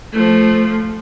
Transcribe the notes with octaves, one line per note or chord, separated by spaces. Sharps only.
F3 A3